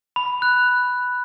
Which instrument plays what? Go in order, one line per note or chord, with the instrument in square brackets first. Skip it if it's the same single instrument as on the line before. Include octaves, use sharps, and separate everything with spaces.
[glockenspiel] B5
F#6